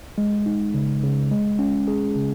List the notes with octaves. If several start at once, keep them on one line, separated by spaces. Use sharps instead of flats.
G#3
D#4
C#3
C#3
G#3
C#4
G#4
C#3